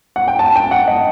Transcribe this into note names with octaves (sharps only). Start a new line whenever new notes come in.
F#5
G5
A5
G5
F#5
D#5